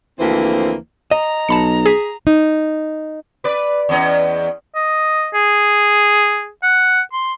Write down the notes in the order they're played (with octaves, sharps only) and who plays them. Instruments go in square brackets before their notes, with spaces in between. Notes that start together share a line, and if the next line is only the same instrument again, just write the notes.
[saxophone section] D2 E3 F3 A#3 C4 C5
[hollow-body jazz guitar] D#5 [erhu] A#5
[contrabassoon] B1 [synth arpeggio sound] A5 B5 C#7
[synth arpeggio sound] G#4 B6
[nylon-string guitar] D#4
[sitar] B4 D5
E2 C#4 D#5
[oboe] D#5
G#4
F#5
C6